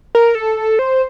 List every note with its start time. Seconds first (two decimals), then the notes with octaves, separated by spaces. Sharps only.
0.15 A#4
0.35 A4
0.79 C5